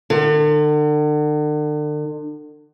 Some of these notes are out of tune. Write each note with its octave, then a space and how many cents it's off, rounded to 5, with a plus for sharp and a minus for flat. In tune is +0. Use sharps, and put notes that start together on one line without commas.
D3 +40